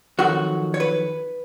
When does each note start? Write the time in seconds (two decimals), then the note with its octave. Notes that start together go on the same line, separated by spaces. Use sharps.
0.19 F2 D#3 F#3 F#4
0.74 C#5
0.80 B4